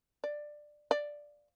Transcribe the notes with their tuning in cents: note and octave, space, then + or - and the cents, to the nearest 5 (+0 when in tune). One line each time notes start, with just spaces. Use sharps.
D5 +15
D5 +0